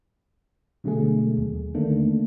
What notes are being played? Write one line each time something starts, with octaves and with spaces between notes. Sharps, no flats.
B2 D3 F#3 G#3 A3 G#4
D#2
D3 D#3 A3 A#3 D4